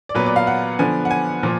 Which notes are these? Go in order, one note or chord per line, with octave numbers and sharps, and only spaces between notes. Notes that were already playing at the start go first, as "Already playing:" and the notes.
D5
A#2 F#3 B3 B4
D5
F5
F#5
D3 F3 B3 D4 G#5
F#5
G#5
A#2 F3